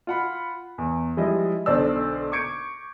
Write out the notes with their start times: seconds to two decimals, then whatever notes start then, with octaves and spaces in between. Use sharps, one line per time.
0.07 F4 F#5 B5
0.78 E2
1.17 F3 G3 G#3 E4 D#5
1.66 B1 D3 C5 D5 E6
2.32 C#6 D6 G6 G#6 C#7 D7